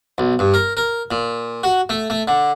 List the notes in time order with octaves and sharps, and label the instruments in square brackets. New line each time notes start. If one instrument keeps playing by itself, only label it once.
[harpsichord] B1
G2
A#4
A#4
A#2
F#4
A3
A3
D3